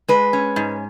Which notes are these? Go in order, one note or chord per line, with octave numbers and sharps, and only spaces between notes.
G#3 B4
C#4
G#2